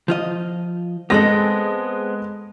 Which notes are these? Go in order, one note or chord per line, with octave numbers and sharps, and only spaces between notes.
F3 F4 D#5
G#3 B3 C4 A4 A#6